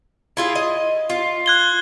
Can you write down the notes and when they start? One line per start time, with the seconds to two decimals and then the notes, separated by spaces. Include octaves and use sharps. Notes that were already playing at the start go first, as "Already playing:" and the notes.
0.37 E4 F4 G#4
0.55 D#5
1.10 F4
1.46 F#6 G#6 G7